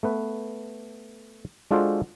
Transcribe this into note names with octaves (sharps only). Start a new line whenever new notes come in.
A3 B3 B4
G#3 D4 F4 F#4 A4 C5